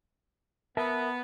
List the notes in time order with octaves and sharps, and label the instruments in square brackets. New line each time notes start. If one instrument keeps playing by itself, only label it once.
[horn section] B3 [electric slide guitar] A#4 E5 A5